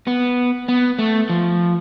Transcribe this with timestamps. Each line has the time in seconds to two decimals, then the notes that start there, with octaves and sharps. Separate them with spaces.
0.07 B3
0.68 B3
0.99 A3
1.30 F3